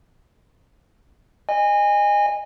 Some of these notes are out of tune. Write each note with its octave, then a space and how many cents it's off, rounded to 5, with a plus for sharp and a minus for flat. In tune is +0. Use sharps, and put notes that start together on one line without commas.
D#5 -25 G#5 -25